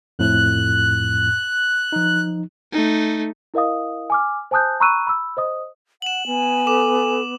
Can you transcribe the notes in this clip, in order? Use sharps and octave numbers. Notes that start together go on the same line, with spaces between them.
F2 A2 F#6
F3 D#4
A3 D#4
E4 A#4 D#5 F5 D#6
G#5 D6 F6
C5 G#5 A5 D#6 F#6 G6
A#5 B5 C#6 E6 F#6 D#7
B5 E6
C5 D#5 D#6
F#5 E7 F#7
B3 G#5
A4 D6 E7